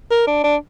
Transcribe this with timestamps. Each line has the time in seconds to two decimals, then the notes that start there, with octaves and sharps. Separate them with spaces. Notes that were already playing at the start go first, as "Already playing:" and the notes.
0.11 A#4
0.27 D4
0.44 D4